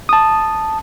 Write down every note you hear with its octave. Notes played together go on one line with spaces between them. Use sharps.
A5 D#6